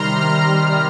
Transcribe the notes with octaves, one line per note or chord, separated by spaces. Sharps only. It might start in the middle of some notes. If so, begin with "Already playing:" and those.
Already playing: C3 D#3 G3 A#5 C6 F6
C6
A#5